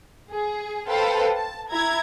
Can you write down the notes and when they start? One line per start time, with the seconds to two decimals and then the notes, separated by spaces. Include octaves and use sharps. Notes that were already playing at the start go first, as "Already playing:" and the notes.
0.29 G#4
0.87 A4 B4 C5 F5 G5 A5
1.35 A5
1.70 E4 A#5 G#6